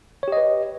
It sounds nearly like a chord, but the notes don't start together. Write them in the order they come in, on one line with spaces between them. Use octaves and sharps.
C#5 G4 D#5 B4